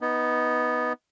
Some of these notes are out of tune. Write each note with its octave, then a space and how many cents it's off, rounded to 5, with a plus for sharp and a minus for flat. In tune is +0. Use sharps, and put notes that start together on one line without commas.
B3 +0 D#4 +15